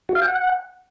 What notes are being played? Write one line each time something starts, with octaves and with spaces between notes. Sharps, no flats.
F#4
F5
G5
F#5